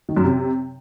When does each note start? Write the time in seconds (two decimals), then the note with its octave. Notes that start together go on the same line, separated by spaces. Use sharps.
0.09 D#3
0.17 F#2
0.24 C3